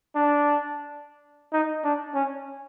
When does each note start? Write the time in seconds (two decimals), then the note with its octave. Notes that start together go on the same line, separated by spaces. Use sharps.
0.16 D4
1.53 D#4
1.84 D4
2.15 C#4